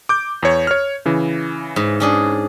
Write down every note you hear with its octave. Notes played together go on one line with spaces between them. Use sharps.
D6 G6
E2 C#5
C#5 F6
C#3 E3
G#2
C#4 D4 G#4